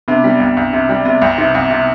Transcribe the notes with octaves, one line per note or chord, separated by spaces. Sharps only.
C3 B3 D4
G3
C2
C2
C3
G3
C3 B3
C2 C4
C3 C4 D#4
C2
C3